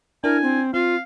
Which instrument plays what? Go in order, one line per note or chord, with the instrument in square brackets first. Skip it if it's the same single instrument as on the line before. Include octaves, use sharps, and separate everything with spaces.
[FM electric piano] D4 E4 [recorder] A#4 [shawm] G#5
[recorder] C4
[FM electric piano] C4 [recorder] F4 [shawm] F5